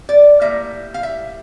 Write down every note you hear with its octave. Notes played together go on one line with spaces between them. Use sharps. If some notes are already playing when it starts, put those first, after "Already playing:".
D5
A2 G3 A#3 E5
F5
E5